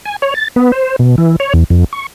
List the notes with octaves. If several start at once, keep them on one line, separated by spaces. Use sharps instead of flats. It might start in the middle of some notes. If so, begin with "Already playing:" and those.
G#5
C#5
A6
B3
C5
B2
E3
C#5
E2
F2
C#6